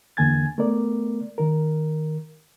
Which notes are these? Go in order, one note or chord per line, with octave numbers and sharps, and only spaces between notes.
E2 D3 A#3 G#5 G#6 A6
A3 B3 A#4 D5
D#3 A#4